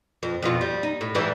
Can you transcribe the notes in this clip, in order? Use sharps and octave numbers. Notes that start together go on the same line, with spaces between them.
F2
F2 B2 F4
G3
D#4
A2
G#2 E3 G3